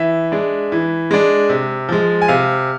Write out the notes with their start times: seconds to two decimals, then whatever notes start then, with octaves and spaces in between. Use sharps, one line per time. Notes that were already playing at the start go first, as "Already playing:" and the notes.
Already playing: E3 E5
0.32 G#3 D4
0.72 E3
1.11 G#3 D4
1.49 C3
1.89 F3 G#3
2.22 G#5
2.28 C3 F5